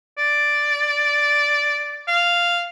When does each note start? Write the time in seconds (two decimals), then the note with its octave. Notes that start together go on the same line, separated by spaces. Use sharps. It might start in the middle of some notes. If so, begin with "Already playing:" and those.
0.18 D5
2.08 F5